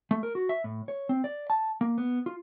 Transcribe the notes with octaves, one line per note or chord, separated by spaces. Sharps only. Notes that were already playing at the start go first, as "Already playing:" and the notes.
A3
A#4
F#4
E5
A2
C#5
C4
D5
A5
A#3
B3
F4